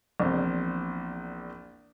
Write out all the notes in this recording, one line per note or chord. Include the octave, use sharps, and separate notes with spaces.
A#1 E2 C4